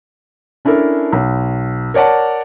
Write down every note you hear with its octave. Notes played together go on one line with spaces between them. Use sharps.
C#4 D4 E4 A4 A#4
B1
A#4 C#5 D5 F#5 A5